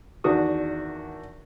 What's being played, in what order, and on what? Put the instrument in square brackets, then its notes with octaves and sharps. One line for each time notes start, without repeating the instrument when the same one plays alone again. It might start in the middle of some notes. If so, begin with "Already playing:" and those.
[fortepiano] E2 D#3 D4 F#4 D#6